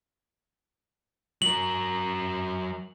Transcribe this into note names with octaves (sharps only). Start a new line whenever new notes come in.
F#3 A#4 F#7